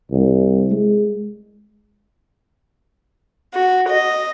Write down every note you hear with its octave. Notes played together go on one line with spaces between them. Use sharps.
C2
G#3
F#4
D#5